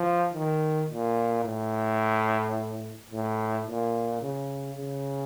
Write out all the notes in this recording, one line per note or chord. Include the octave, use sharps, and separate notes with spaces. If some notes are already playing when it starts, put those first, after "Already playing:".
Already playing: F3
D#3
A#2
A2
A2
A#2
C#3
C#3